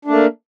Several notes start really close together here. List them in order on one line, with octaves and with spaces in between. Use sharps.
D4 A3 A#3